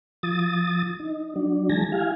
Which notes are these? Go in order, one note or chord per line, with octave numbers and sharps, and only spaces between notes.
F3 D#6 A6
D#4
F#3 D4
E3 G#3 G#5 A5 A#6
E4 G4 F5 G#5